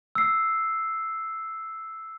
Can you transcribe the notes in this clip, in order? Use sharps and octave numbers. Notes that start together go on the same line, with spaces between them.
E6 C7